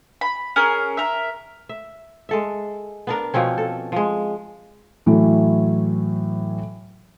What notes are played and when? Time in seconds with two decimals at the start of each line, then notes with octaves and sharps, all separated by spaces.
0.21 B5
0.56 C#4 G#4 A#4
0.97 A#4 E5
1.69 E5
2.29 G#3 A4 E5
3.07 B3 D4 A#4
3.34 B2 F3 C4 C#4
3.58 A4
3.92 F3 G#3
5.06 A2 E3 F#3 A3